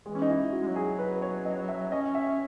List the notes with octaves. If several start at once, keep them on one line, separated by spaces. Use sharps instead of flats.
E3 G#3
C#4
D#4
E4
F#4
G#3
F#3
G#4
B4
B4
C#5
D#5
E5
C#4 D#5
E5